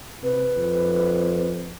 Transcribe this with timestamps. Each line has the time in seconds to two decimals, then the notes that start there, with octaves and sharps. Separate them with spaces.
0.23 C3 B4
0.56 F2